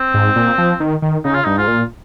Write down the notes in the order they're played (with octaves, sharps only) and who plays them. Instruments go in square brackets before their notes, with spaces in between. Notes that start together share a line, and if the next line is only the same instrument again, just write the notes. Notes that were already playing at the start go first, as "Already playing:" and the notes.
Already playing: [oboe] C4
[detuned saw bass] G#2
A#2
F3
D#3
D#3
[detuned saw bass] C#3 [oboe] D#4
[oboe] F4
[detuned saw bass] G2 [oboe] D#4
[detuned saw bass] G#2 [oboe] F4
[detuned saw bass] A#2